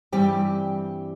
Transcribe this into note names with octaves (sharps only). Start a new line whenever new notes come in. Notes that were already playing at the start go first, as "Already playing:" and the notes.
G2 E3 G3 C4 G4